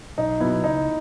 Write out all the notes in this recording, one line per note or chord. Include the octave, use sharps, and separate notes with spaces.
B1 D#4
B2 F#3 B3 E4
C#2 D#4